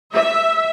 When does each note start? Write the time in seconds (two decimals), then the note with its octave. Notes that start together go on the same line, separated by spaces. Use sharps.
0.14 E5